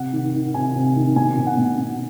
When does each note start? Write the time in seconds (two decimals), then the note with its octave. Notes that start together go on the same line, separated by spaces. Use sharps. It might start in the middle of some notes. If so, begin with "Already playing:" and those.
Already playing: C3 F#5
0.13 D#3
0.34 D#3
0.54 C3 G#5
0.75 C3
0.96 D#3
1.15 B2 G#5
1.37 B2
1.47 F#5
1.57 B2
1.78 B2